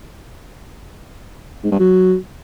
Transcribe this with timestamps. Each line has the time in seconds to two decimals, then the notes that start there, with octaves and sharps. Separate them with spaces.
1.64 G#2
1.72 G2
1.79 F#3